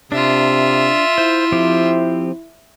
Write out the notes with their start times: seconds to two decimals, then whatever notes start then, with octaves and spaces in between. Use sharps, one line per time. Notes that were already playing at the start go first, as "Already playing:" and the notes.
0.12 C3 D4 F4 E5
1.18 E4 C5
1.52 F3 C4 G4